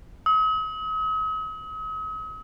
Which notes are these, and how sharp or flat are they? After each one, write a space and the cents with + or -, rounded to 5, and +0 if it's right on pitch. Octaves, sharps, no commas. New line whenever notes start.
D#6 +45